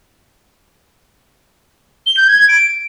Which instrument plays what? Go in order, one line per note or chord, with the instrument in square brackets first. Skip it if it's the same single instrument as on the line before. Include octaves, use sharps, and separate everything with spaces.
[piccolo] G7
G6
G#6
G#6
D7